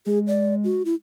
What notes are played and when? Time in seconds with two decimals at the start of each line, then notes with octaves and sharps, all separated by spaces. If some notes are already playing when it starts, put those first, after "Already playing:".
0.06 G#3 G#4
0.27 D5
0.64 F#4
0.85 E4